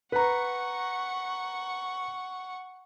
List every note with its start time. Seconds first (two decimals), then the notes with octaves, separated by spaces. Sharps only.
0.12 B4 F#5 A#5 C#6